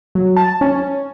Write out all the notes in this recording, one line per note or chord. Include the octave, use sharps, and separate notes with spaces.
F#3
A5
C#4